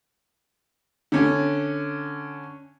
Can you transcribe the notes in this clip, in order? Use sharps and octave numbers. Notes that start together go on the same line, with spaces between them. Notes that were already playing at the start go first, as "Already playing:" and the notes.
D3 C#4